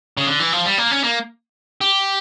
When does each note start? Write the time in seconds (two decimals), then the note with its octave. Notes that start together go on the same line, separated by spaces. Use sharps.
0.17 C#3
0.27 D3
0.40 E3
0.53 F3
0.66 G3
0.78 A#3
0.91 C#4
1.04 A#3
1.81 G4